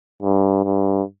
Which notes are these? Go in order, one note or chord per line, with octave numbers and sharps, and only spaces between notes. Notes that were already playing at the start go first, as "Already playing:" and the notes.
G2
G2